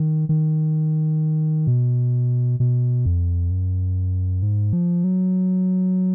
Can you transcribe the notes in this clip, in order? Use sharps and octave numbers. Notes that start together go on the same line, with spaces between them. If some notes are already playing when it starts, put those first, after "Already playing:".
Already playing: D#3
D#3
B2
B2
F2
F#2
G#2
F3
F#3